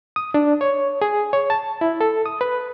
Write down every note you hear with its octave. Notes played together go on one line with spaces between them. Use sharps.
D#6
D4
C#5
G#4
C#5
A5
E4
A4
D#6
B4